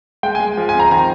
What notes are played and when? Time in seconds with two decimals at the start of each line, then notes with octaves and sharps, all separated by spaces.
0.23 G#3 G5
0.35 G#5
0.40 G#3
0.57 F3
0.69 G#5
0.74 C4
0.80 A#5
0.91 D#3 A#5